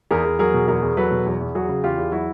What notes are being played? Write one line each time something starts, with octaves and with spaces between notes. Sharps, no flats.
E2 G#4 A#4
E2
F#3 G#4 A#4
B2
E2 G#4 A#4
E2
F#3 A4 B4
B2
E2
E2
F#3 F#4 G#4
C#3
E2 F4 G4
E2
F#3 E4 F#4